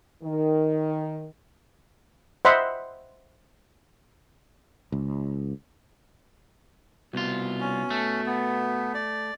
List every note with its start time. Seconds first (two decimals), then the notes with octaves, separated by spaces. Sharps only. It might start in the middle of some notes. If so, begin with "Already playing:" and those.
0.23 D#3
2.45 C5 D#5 E5 F#5 B5 C6
4.92 C#2
7.13 C2 B2 F4
7.60 C#4
7.90 A3
8.26 B3
8.94 D5